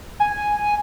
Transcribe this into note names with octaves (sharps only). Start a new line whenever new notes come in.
G#5